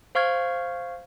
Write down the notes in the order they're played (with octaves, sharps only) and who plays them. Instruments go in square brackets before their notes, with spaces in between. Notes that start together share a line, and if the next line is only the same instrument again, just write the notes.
[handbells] C5 F5 C#6 F6 G#6